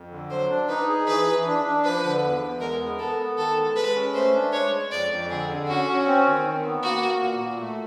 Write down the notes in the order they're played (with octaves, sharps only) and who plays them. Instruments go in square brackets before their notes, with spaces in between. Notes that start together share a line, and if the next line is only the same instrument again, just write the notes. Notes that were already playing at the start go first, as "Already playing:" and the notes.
Already playing: [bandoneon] F2
D3
[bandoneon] F#3 [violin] C5
[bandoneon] D4
[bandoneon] D#4 [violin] B4
[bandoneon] G#4
[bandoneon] E3 [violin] B4
[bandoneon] E3
D4
D4
[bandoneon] F3 [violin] B4
[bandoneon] D3
E2
E2
[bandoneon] G#3 [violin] A#4
[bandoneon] B3
[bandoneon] B3 [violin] A4
[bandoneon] B3
[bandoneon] D#3 [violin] A4
[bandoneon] G#3
[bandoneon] G#3 [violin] B4
[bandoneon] C#4
[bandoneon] A3 [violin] C5
[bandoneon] D4
[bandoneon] G#3 [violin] C#5
[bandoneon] G#3
[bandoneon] F2 [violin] D5
[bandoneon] F2
[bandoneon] D3 [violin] G#4
[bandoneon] D3
[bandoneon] C#4 [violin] F#4
[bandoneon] C#4
C4
D#3
D#3
B3
[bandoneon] A#3 [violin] F#4
[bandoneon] A#3
A#2
A#2
A3